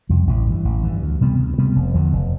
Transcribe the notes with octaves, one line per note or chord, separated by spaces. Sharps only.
F2 C3 G3
A1
G2 E3
A1
G2 E3
D2
C3 G3 B3
D2
C3 G3 B3
F1
E2 D3 F3
F1